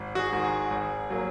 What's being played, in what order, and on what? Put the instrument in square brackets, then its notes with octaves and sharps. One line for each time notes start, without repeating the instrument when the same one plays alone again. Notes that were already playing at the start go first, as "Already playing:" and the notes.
Already playing: [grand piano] G#1
F#4
G#4
G#2 D#3
G#4
G#1
F#3 A#3